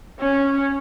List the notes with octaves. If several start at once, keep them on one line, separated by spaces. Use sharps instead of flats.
C#4